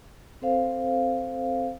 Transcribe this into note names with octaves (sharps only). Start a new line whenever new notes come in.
C4 A4 C5 F5